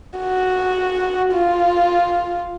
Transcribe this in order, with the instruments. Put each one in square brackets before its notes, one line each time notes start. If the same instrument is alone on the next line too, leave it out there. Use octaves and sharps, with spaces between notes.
[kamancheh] F#4
F4